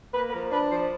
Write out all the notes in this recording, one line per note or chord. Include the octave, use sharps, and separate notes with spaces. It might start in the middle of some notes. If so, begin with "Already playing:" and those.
A#3 B4
B4
F3 A#4
D4 B4
F3 C5